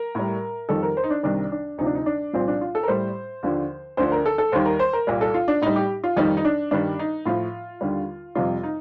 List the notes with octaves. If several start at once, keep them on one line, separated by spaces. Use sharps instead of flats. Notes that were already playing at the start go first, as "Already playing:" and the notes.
Already playing: A#4
A2 G3
F2 D#3 G3 A4
A#4
C5
D#4
D4
C2 C3 D#3 G3 D4
D4
D2 C3 F3 D#4
D4
D#4
D4
C2 A#2 F3 C4
D4
F4
A4
A#4
A2 G3 C5
D#2 D3 F3
D2 D3 F3 C5
A#4
A4
A4
D#2 D#3 G3 C5
A#4
C5
A#4
C2 A#2 G3
A4
F4
D4
A2 G3 D#4
G4
F4
F2 D#3 G3 D#4
D#4
D4
G2 D#3 G3 D4
D#4
A2 F3 F4
D#2 D3 G3
F2 C3 G3 F4
D#4